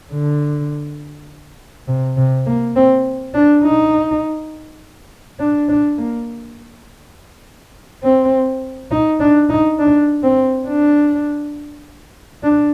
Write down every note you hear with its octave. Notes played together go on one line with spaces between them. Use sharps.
D3
C3
C3
A#3
C4
D4
D#4
D4
D4
A#3
C4
D#4
D4
D#4
D4
C4
D4
D4